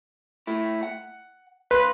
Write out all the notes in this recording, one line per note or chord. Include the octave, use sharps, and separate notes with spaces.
A3 E4
F#5
C#2 B4 F5 C6